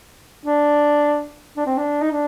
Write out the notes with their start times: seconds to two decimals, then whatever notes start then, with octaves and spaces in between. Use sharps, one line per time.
0.45 D4
1.57 D4
1.66 C4
1.77 D4
2.01 D#4
2.11 D4